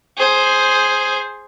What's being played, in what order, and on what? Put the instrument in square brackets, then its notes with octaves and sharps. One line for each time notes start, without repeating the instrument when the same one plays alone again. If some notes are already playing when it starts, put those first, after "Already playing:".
[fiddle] G#4 C5